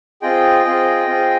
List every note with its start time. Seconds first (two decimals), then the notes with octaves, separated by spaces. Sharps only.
0.22 C4 F4 G#4 D#5 G5
0.65 C4 F4 G#4
1.07 C4 F4 G#4